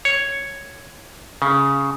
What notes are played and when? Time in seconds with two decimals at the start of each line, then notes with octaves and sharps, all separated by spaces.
0.05 C#5
1.42 C#3